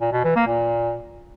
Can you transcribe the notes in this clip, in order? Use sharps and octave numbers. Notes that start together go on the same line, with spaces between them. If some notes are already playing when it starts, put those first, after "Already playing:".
A#2
B2
E3
A#3
A#2